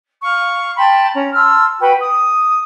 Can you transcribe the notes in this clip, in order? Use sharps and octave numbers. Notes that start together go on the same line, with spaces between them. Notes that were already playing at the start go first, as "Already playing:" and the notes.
F5 C#6
G5 A5 B5 C6
C#4 A#5
A5 C6 E6 F6
F#4 B4 G5 B5
D#6